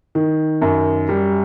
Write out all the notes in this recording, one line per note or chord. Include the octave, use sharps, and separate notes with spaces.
D#3
F#2
G3